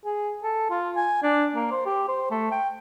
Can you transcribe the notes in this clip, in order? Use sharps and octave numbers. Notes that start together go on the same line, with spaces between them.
G#4
A4
F4
G#5
D4
A#3
C5
G4
C5
A3
G5